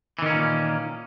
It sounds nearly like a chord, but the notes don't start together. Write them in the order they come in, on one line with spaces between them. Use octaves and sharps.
E3 D#3 C#4 A#3 A#2